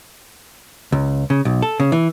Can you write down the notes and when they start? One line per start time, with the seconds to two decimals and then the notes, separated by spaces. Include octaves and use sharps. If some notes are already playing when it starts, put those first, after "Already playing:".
0.92 C#2
1.30 C#3
1.45 B1
1.62 A4
1.80 C#3
1.92 E3